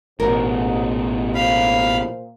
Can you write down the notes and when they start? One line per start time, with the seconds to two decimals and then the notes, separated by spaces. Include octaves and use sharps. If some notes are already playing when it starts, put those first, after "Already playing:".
0.20 A1 G#2 B2 A#4
1.35 A#2 A#3 C5 F5 B5